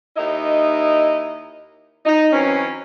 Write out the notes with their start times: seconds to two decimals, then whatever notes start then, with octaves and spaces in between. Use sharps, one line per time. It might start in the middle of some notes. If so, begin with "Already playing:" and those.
0.17 D#2 D#4 E4 D#5
2.06 D#4
2.33 E3 F#3 C4 C#4